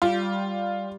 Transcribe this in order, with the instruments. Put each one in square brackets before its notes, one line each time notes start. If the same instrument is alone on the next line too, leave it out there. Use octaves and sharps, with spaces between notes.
[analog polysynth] G3 [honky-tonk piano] F4